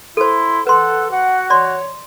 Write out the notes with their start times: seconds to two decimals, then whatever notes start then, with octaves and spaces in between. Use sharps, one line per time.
0.17 E4 A4 C5 C6
0.67 A4 B4 F#5 C6
1.11 F#4 F#5
1.50 C#5 D5 C6